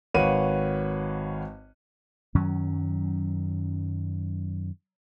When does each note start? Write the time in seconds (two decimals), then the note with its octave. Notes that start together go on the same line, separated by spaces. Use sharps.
0.14 G#1 B4 C#5 F5 F#5 D#7
2.35 F#2 D#3 F#3 C#4